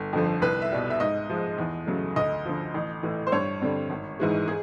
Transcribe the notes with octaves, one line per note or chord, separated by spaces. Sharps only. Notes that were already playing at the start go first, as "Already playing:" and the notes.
Already playing: G1
F2 D3 F3
C2 B4
E5
B2 G3
E5
G#2 D#5
F3 G#3
E2
C#3 F#3 A3
D2 D#5
D3 F3
A1
A2 E3
C5
G2 C#5
D3 G3 C4
G#1
G#2 E3 G#3
G#4